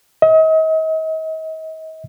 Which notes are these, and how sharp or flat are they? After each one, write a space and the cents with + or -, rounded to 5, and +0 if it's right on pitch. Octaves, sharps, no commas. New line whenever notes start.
D#5 +40